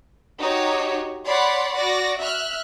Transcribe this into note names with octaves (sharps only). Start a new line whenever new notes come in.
D#4 F#4 G4 C#5
C#5 D5 F#5 B5 C6
F#4 D5 A#6
E5 F6 F#6